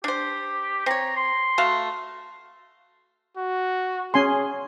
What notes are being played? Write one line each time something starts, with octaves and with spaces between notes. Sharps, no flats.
D4 G4 C5
C4 C#5 A#5
C6
A3 F#4 F5
F#4
C#4 G#4 G#5 C6